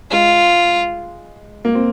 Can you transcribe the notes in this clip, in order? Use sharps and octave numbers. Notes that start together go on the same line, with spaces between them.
G#3 F4
A#3
C4